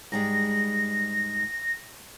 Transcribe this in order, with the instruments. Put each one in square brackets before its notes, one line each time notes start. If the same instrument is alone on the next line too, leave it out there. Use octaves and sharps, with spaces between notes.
[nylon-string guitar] G#2 G3 G#3 [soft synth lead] A#6